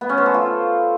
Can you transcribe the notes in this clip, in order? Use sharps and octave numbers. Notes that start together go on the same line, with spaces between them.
B3
C#4
C5
A4
F4